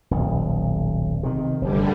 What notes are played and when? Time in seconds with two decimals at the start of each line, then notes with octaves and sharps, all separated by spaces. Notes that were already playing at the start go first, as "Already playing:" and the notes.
0.11 D#1 B1
1.23 C3 D#3
1.62 F1 F#2 D3 G3